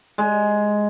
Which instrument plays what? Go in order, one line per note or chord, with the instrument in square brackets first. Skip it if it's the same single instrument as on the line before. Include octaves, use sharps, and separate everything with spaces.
[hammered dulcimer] G#3